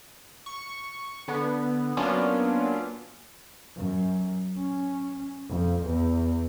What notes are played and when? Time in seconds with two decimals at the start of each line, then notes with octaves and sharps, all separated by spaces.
0.46 C#6
1.28 D3 B3
1.97 F#3 A#3 B3 C#4 D4 F4
3.76 F#2
4.57 C#4
5.48 F2
5.86 E2